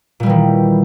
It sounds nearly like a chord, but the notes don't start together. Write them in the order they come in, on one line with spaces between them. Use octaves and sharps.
A#2 G3 E3 D#3